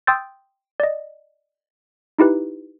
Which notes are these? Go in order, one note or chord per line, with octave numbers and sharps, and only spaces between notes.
G5 C6 D#6 E6 G6 A6
D5 D#5
D#4 E4 G4 B4